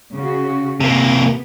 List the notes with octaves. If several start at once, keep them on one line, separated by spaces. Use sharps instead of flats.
C#3 F#4
C3 A#3 B3